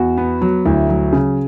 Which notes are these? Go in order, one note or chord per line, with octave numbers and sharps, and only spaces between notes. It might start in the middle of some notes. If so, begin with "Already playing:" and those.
Already playing: E2 F#4
B3
F#3
D2 E4
F#3
C#3